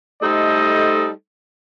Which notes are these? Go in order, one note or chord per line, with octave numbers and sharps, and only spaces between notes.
G3 A3 D#4 A4 C5 D#5